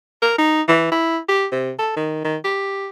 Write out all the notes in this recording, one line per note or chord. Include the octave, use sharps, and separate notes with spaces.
A#4
D#4
E3
E4
G4
C3
A4
D#3
D#3
G4